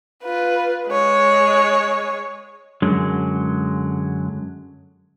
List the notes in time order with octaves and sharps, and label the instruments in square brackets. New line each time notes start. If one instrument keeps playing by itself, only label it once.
[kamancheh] F4 B4
G#3 C#5
[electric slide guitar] F#2 D3 F#3 G#3